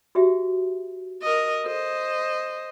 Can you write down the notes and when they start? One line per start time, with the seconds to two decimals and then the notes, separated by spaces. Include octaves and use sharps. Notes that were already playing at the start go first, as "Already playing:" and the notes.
0.15 F#4 G4 E5
1.22 A#4 D#5
1.66 A4 C5 D#5